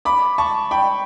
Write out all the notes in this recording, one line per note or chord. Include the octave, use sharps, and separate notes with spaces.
B5 D6
A5 C#6
G5 B5